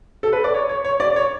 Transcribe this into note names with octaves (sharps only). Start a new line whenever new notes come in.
A4
B4
D5
C#5
C#5
C#5
D5
C#5